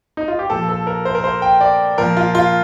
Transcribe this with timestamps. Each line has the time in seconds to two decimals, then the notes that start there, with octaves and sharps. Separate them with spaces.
0.17 D#4
0.28 F4
0.39 G4
0.50 A#2 F3 A4
0.69 A4
0.87 A#4
1.05 C5
1.15 A#4
1.24 C5
1.42 G5
1.61 D5
1.98 A#2 F3 A#4
2.17 F4
2.35 F4